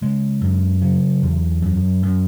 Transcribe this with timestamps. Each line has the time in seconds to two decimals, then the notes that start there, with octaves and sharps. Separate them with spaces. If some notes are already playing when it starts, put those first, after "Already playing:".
0.01 C#3 G#3
0.41 F#2
0.81 C#3 F#3
1.22 E2
1.62 F#2
2.03 F#2